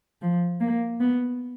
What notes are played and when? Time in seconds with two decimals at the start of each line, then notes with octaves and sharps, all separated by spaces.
0.21 F3
0.60 A#3
1.00 B3